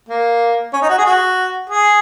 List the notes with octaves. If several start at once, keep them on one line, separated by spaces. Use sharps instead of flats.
A#3
C#4
D#4
F#4
G#4
F#4
G#4